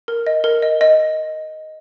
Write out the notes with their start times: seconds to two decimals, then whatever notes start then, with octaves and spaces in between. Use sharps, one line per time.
0.08 A#4
0.27 D#5
0.44 A#4
0.62 D#5
0.81 D#5